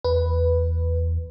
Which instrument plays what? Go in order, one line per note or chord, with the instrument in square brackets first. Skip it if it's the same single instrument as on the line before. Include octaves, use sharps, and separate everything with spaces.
[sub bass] E2 [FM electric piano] B4